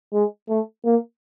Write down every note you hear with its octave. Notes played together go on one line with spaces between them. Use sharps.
G#3
A3
A#3